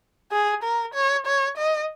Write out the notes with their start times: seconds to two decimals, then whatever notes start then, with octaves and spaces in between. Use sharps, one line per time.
0.32 G#4
0.64 A#4
0.94 C#5
1.26 C#5
1.58 D#5